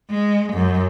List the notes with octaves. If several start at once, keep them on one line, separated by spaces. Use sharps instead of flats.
G#3
F#2